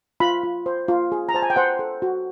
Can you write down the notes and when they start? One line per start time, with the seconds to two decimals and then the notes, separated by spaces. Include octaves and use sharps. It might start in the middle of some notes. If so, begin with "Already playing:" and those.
0.20 F4 B5
0.43 F4
0.66 C5
0.88 F4
1.12 G#4
1.29 A#5
1.34 C5 A5
1.42 G#5
1.50 G5
1.56 C5 F#5
1.79 A4
2.02 F#4